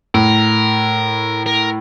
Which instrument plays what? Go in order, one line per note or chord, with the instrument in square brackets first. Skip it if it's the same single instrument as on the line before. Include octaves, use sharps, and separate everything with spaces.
[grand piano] A2 [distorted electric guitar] A#4
[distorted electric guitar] A#4